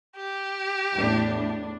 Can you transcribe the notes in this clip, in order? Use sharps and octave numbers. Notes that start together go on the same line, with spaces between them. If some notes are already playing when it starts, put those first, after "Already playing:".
G4
E2 A2 D4